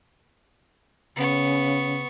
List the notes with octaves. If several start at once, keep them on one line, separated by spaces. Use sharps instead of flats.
C#3 B3 C#6